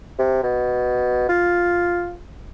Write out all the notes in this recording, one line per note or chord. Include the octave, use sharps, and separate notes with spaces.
C3
B2
F4